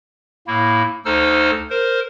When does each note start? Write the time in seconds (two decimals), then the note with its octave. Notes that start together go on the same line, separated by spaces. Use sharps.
0.47 A2 A#3 E4
1.05 D2 D#4 A4 C5 E6 F6
1.70 A#4 C5